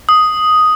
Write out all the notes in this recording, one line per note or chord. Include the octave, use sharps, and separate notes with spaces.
D#6